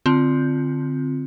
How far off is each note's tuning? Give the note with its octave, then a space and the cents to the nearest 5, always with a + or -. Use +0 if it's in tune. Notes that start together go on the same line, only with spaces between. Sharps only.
D3 +0 C4 +0 F4 +0